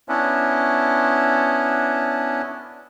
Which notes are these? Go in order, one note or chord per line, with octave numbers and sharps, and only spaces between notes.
B3 C#4 D4 E4